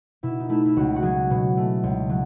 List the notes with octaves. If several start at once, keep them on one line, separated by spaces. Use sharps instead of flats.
B2 E4
D#4
A3 E4
E4
C#2 F#4
F#4
F#3 G#4
B2
A3
C#2
F#3